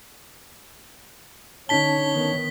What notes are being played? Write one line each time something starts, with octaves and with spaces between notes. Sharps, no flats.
D3 C#4 D#4 C#5 A5 B6 G7
D#3 B3